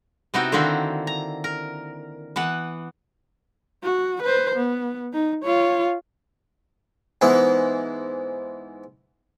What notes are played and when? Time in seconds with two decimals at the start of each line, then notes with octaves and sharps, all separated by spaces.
0.34 C3 B3 D#4 E4 F#4 G5
0.52 D3 D#3 A#3 C4 E4 F#4
1.07 A#5
1.44 A#4
2.36 E3 B3 F#5
3.83 F#4
4.22 B4 C5
4.55 B3
5.13 D#4
5.44 F4 C#5
7.21 G#2 E3 B3